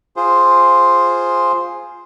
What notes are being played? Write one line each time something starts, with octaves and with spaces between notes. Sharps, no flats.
F4 G#4 C5